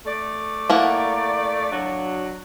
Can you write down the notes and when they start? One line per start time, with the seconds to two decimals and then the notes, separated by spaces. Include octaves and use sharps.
0.06 A3 D5
0.70 A#3 E4 F#5
1.71 F#3 D4 F#4